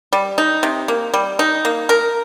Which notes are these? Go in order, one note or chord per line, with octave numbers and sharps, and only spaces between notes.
G3
D#4
C3
A#3
G3
D#4
A#3
A#4